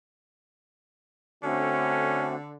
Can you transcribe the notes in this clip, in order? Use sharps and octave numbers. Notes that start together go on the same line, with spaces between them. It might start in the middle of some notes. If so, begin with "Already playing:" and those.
D3 A3 C4 C#4 F#4